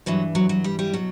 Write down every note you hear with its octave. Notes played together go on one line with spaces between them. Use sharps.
G2 E3 F#3
F#3
F#3
G3
G3
B2 F#3